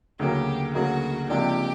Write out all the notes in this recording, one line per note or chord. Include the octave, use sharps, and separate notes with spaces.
D2 C#3 F#3 A#3 G4
D2 C#3 F#3 A#3 F#4
C#2 C3 F3 A#3 D4 G4